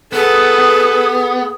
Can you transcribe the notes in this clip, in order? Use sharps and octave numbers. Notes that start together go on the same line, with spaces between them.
B3 G#4 A4 B4